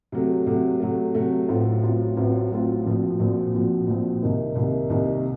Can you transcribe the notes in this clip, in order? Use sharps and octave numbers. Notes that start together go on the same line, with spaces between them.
C3 F#3 A3
C3 F#3 A3
C3 F#3 A3
C3 F#3 A3
A1 A2 F#3 C4 F4
A1 A2 F#3 C4 F4
A1 A2 F#3 C4 F4
A1 A2 F#3 C4 F4
A#1 A#2 F3 C4 F#4
A#1 A#2 F3 C4 F#4
A#1 A#2 F3 C4 F#4
A#1 A#2 F3 C4 F#4
C2 C3 D#3 A#3 D#4
C2 C3 D#3 A#3 D#4
C2 C3 D#3 A#3 D#4